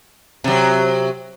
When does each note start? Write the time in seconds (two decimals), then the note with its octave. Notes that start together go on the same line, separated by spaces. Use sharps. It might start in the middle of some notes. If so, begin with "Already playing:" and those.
0.44 C3 F#3